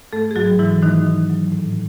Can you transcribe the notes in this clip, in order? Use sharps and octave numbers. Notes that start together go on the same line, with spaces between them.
G#2 A3 A4
G#4
G#2 F#3 F#4
G#2 E3 E4
D#3 A3 D#4
F#3
F#3
A2